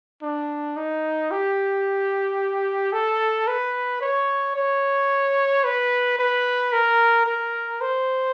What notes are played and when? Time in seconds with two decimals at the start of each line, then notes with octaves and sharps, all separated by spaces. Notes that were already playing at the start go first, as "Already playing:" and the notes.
0.22 D4
0.76 D#4
1.31 G4
2.93 A4
3.48 B4
4.01 C#5
4.56 C#5
5.64 B4
6.19 B4
6.72 A#4
7.26 A#4
7.81 C5